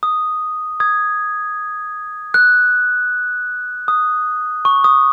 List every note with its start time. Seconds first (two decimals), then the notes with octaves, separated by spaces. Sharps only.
0.03 D#6
0.80 D#6 G#6
2.34 F#6
3.88 D#6
4.65 C#6
4.84 D#6